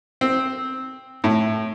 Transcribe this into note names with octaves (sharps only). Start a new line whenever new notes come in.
C4
A2